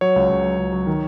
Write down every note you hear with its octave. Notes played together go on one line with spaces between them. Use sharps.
F#3 C#5
C#2
C#2
F#3
C#2
F#3
D#3